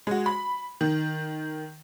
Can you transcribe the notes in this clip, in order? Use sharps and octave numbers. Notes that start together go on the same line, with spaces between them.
G#3 F#4
B5
D#3